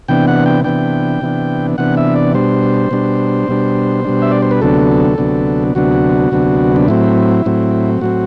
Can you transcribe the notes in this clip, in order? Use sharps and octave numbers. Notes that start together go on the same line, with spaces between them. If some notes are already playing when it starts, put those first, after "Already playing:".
C3 E3 B3 D4 G5
F#5
G5
C3 E3 B3 D4 G5
C3 E3 B3 D4
C3 E3 B3 D4 F#5
E5
D5
B2 G3 D4 C5
B2 G3 D4
B2 G3 D4
B2 G3 D4
E5
D5
C5
B4
D2 C3 F#3 B3 D4 A4
D2 C3 F#3 B3 D4
D2 C3 F#3 B3 D4 F#4
D2 C3 F#3 B3 D4
D4
A2 F#3 C4 E4
A2 F#3 C4
A2 F#3 C4 F#4